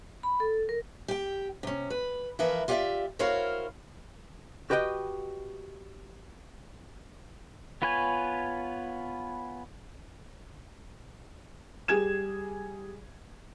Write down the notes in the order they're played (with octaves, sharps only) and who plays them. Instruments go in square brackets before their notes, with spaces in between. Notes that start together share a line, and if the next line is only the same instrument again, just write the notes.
[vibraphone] B5
A4
A#4
[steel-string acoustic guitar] G4 G5
C3 C#4
B4
E3 F3 A#4 B4 E5
F4 G4 A#4 C#5 D5 E5
E4 F#4 A#4 C5 C#5 F5
[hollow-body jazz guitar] F#4 G4 B4 D#5 G5
[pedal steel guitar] B3 F4 B4 C#5 G#5
[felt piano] G3 G#4 G#6 E7